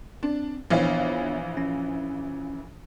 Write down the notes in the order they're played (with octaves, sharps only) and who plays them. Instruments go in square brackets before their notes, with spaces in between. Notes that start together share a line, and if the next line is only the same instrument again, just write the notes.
[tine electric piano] C4 [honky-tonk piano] D4
[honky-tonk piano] A#1 E3 F5 [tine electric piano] B3 D4 C#5
[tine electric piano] C#4